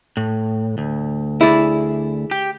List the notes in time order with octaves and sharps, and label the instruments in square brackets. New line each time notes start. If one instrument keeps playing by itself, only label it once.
[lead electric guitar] A2
D2
[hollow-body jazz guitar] E4 G#4 D5
[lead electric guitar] G4